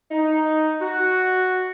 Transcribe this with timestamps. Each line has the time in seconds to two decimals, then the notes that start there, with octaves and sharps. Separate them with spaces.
0.11 D#4
0.81 F#4